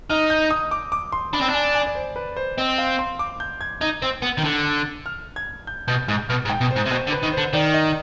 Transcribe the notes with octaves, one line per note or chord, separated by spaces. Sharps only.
D#4 F6
G6
D#6
D6
D6
C6
D4 B5
C4
D4 G#5
G#5
D5
C5
B4
C5
C4 D#5
F5
C6
D6
G6
G#6
D#4 G#6
C4
B3
D#3
D3
F6
G#6
G6
B2 G6
G#2 G6
B2 F6
G#2
G5
B2
C5
G#2
C3
B2 C5
D3
B4
D#3
C5
D3
D#3 D5
D#5